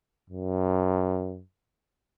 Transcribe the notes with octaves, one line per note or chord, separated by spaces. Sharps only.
F#2